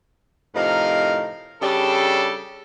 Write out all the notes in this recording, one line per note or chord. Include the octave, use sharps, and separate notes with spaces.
A2 C3 F3 D#4 A#4 F5
C#3 G3 D4 G4 A4